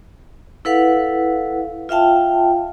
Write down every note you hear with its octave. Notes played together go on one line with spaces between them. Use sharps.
E4 A4 B4 F5 F#5
F4 E5 F5 G5 A5